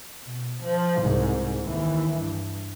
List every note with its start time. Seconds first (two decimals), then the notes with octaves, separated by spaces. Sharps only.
0.24 B2
0.63 F3
1.01 C2 G#2
1.62 D#2 E3
2.17 G2